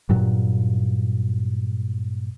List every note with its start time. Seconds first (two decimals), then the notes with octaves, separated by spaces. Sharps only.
0.09 G2 A#2 F#3